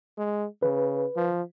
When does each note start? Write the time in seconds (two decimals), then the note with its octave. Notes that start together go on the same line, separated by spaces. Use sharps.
0.18 G#3
0.63 C#3 B4
1.16 F3